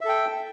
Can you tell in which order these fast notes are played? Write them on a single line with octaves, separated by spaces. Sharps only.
E5 A4 G5